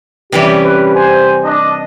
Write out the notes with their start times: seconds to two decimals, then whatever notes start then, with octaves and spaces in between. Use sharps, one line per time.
0.32 C3 E3 G3 C#4 G4
0.64 B4
0.94 C5 G#5
1.44 D4 D#5